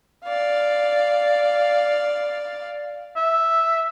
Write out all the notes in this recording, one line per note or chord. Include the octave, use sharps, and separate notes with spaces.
D5 F5
E5